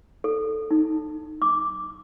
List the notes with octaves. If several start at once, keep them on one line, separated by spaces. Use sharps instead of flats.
A4
D#4
D6